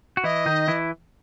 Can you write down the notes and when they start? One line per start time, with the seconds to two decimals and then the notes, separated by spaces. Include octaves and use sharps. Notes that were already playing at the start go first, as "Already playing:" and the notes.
0.17 F#4
0.24 E3 E4 D#5
0.46 D#3 D#4
0.68 E3 E4